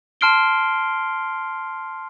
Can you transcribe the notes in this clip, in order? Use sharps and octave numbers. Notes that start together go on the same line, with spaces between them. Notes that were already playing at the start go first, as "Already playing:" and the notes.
A5 C6 F6 C7 D7 G7